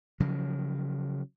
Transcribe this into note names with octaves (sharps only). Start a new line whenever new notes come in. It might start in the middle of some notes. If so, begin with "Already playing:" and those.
C#3 F3 F#3